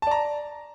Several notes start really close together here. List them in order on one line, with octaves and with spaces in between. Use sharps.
A5 D5 A#5